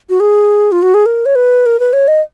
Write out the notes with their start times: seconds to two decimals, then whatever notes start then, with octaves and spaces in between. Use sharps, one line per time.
0.10 F#4
0.20 G#4
0.72 F4
0.82 F#4
0.94 G#4
1.06 A#4
1.26 C#5
1.35 B4
1.66 A#4
1.80 B4
1.93 C#5
2.08 D#5